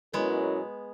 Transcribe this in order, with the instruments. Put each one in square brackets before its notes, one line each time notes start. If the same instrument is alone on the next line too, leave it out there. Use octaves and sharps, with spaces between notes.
[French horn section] B2 F#3 C#4 E4 A#4 [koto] G#3 B3